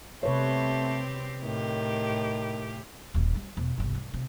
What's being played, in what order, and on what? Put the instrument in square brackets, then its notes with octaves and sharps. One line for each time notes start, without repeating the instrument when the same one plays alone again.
[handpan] C3 B4 C#5 [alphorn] A3 [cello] C4 G4
[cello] A2 G4 [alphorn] D#3
[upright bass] D#1 D#2
G3
E1
G1 C2
G2
C3